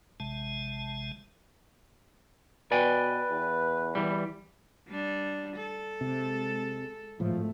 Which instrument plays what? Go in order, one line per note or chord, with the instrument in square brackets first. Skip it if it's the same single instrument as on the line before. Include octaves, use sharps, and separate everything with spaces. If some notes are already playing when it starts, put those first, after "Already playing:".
[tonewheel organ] A1 C3 G#3 A5
[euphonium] B2 [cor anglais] B4 [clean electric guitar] D5 G5 G#5
[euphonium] E2
[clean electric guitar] E3 G3
[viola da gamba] G3 D4
A4
[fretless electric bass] C3 [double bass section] G#3
[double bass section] G#1 A3 [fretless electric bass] A2 F3